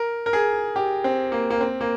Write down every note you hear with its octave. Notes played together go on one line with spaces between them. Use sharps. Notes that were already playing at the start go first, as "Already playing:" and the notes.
Already playing: A#4
A#4
G#4
G4
C4
A#3
A#3
C4
A#3